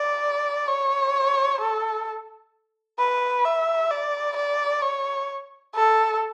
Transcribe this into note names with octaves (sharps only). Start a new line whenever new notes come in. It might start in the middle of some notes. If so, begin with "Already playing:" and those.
Already playing: D5
C#5
A4
B4
E5
D5
D5
C#5
A4